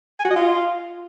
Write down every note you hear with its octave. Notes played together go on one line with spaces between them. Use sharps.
G#5
F#4
D#5
F4